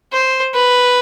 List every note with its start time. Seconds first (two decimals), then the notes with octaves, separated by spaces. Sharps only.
0.12 C5
0.54 B4